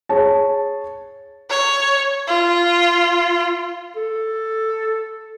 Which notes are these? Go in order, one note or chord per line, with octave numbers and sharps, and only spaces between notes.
G#4 C#5 A5
C#5
F4
A4